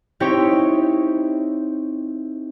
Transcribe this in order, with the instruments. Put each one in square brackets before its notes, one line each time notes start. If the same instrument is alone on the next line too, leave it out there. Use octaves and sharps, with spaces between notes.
[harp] C4 D#4 E4 G4 C#5 G5